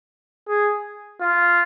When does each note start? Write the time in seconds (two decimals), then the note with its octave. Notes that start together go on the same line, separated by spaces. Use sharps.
0.48 G#4
1.21 F4